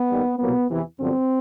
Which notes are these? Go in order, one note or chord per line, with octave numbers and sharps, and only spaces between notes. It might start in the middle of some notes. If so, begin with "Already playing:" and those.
Already playing: B3
D#2 D#3 G3
C2 B2 F#3 A#3 B3
E2 C3 E3
G1 F#2 D3 F3 C4